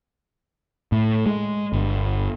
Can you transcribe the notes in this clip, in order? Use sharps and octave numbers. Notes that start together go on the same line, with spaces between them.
A2
G#3
G1